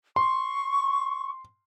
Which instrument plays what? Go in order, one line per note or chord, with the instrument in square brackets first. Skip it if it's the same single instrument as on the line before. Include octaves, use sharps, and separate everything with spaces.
[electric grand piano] C6 [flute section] C#6